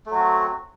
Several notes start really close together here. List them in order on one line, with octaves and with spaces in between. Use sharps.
A3 F#3 F#4 C4